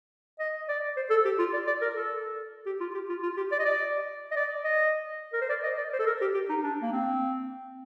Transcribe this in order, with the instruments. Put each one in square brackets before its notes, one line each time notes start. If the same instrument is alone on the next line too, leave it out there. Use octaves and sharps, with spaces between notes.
[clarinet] D#5
D5
C5
A4
G4
F4
D5
D5
A#4
A4
G4
F4
G4
F4
F4
G4
D5
D#5
D5
D#5
D5
D#5
A#4
C5
D5
D#5
D5
C5
A4
A#4
G4
G4
D#4
D4
A#3
C4